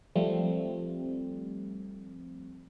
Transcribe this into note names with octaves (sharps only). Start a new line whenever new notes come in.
F3 G3 A3 C4